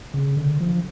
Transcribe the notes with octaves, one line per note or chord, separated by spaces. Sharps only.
C#3
D3
F3